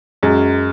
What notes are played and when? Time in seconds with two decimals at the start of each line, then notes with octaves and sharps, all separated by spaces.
0.23 F#2 G#3